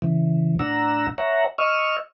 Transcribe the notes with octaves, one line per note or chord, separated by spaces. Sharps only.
C#3 E3
A2 D4 F#5 A#5 E6
C#5 E5 F#5 A#5
D#5 C#6 E6 F6